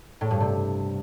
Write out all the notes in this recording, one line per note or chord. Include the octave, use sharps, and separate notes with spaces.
A2
G2
C3